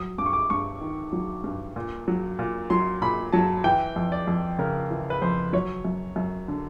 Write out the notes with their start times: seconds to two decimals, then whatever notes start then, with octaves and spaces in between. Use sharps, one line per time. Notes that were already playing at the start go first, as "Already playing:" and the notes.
Already playing: F#3 D#6
0.18 G2 D6
0.26 C#6
0.33 D6
0.50 G2 C#6
0.81 D#3
1.13 F#3
1.44 G2
1.76 A#2
2.08 F#3
2.39 A#2
2.70 F#3 C6
3.02 A#2 B5
3.33 F#3 A5
3.64 E3 G5
3.96 F2
4.12 D5
4.27 F2
4.59 C#3 A#4
4.91 E3
5.10 B4
5.22 F2 C5
5.53 F#3 C#5
5.85 F#2
6.16 F#2
6.48 D3